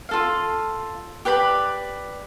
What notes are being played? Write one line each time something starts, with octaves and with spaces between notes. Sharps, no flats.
F4 A4 F5
G4 B4 D5 B5